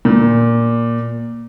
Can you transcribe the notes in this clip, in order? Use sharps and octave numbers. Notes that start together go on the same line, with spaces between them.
A#2